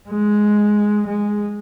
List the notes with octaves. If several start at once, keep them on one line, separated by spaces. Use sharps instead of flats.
G#3
G#3